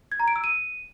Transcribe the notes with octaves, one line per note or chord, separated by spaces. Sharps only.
G#6
A#5
D7
E6
D#7